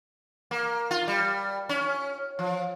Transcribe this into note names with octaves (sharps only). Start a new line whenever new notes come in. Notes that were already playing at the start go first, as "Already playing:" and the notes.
A#3
F4
G3
C#4
F3